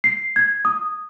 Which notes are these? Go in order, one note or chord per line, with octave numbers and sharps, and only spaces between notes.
C7
G#6
D#6